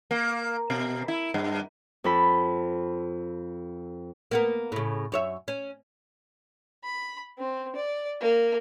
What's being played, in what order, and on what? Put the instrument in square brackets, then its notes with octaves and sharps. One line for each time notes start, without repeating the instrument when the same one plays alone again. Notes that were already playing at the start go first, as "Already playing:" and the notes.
[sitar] A#3
B2
E4
G2
[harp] F2 A4 B5
[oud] A#3 B3 A#4
A2 C#3
F#2 C#5 E5
C#4
[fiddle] B5
C4
D5
A#3